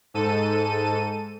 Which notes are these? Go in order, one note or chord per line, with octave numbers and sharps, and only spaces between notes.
G#2 A4 D#7